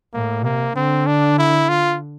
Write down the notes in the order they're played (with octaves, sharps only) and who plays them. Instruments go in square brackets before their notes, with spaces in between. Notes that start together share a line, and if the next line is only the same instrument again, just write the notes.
[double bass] A2 [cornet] A#3
[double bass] C3 [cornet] A#3
[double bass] D3 [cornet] C4
[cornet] D4
E4
F4